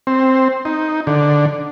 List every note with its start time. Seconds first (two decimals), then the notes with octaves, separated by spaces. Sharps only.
0.07 C4
0.65 D#4
1.07 D3